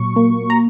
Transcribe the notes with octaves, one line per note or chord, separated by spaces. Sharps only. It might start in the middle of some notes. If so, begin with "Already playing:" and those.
Already playing: A#2 F#3 C#6
A#3
A#5